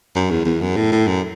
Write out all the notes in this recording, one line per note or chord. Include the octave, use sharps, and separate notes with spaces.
F#2
E2
E2
F#2
A2
A2
F#2